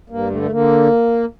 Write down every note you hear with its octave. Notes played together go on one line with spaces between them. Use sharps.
G2 A#3
D3 A3
A3
D3 A#3